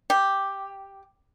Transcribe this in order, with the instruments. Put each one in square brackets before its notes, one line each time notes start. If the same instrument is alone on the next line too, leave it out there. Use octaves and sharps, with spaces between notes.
[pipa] G4